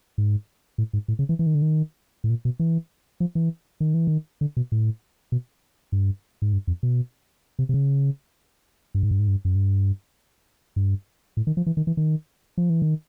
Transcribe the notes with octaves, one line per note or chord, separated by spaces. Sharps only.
G#2
A2
G#2
A2
C#3
E3
E3
D#3
D3
D#3
A2
A#2
B2
E3
F3
E3
D#3
E3
D#3
D3
B2
A2
B2
G2
G#2
G2
F2
B2
C3
C3
C#3
G2
G#2
G2
G#2
G2
F#2
G2
G2
A2
D#3
F3
E3
D#3
E3
D#3
F3
E3
D#3